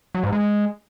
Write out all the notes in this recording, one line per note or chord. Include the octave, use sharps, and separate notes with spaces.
F#3
G#2
G#3